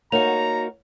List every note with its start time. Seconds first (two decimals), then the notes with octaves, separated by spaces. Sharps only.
0.12 A#3 D#4 F#4 C#5 A#5 F7